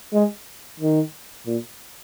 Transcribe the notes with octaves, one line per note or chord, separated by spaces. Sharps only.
G#3
D#3
A#2